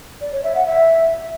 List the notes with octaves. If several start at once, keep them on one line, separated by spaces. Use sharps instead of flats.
D5
C#5
E5
F#5
E5